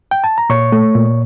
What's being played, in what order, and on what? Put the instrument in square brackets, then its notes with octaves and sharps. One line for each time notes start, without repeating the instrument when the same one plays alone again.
[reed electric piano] G5
A5
A#5
A#2 C#5 C#6
A3
A#2